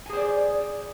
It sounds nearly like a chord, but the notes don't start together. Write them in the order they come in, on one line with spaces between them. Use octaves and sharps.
G#5 G#4 C5 D5